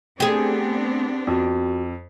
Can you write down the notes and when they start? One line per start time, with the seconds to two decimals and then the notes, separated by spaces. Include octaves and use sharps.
0.20 A3 B3 C4 D4 G4 G#4
1.27 F2 F#4